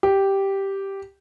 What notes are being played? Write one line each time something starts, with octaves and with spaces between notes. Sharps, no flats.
G4